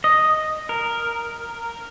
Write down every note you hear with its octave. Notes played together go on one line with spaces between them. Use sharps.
D#5
A#4